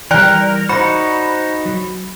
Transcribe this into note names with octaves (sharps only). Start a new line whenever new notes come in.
E3 G3 A#4 D5 G5 F#6
D#4 F#4 C5 B5
F#3